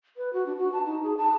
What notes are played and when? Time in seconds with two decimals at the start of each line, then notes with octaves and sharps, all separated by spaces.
0.17 B4
0.33 F#4
0.46 D4
0.58 F#4
0.72 A5
0.86 D#4
1.03 G#4
1.17 A5